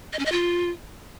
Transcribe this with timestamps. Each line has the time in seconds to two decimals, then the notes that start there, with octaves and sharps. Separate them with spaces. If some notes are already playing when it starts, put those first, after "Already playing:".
0.13 D#5
0.19 C#4
0.26 D#5
0.32 F4